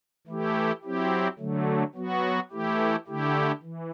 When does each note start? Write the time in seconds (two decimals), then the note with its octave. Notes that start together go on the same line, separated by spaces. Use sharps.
0.27 E3 A3 E4 G4
0.83 F#3 C4 E4 G4
1.39 D3 F#3 A3
1.95 F#3 B3 F#4
2.51 E3 A3 E4 G4
3.07 D3 A3 E4 G4
3.63 E3